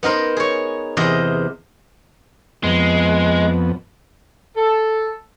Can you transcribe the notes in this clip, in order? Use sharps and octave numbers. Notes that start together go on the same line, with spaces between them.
B3 D#4 A#4 C5
G#4 C#5
E2 C3 C5 D#5
F2 G#3 B3
A4